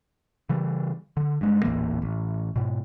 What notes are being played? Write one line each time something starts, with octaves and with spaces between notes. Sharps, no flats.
C#3 E3 G3
D3
G2 G#3
D#1 A1 E3 A#3
A1
G#2 B2